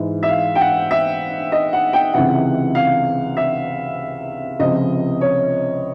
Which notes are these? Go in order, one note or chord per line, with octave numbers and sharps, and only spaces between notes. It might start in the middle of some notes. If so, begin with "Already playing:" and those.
Already playing: G#2 E3
E5
F5
G5
F#5
E5
D#5
F#5
G5
C#2 C3 E3 F#5
F5
E5
C#2 C3 F3 D#5
C#5